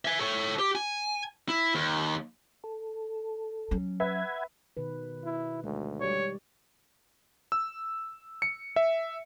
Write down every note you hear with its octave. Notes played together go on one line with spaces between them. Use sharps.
E5 G#5
A4 C#5
G4
G#5
E4
D#2
A4
F#3 C#4
B4 E5 F#5 B5 G#6
B2 D#3 B4
E4
D2 G#3
G3 G4 C#5 D5
E6
C#7
E5